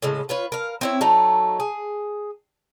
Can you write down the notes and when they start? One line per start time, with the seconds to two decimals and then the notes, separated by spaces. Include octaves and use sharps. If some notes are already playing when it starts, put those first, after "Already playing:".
0.02 A2 C#3 G#3
0.29 F4 B4 C#5
0.52 A#4 F5
0.81 C4 E4 C#5
1.01 F#3 A3 D#4
1.60 G#4